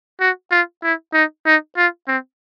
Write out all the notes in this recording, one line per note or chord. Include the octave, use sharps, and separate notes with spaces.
F#4
F4
E4
D#4
D#4
F4
C4